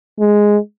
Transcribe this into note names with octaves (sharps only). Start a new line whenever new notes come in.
G#3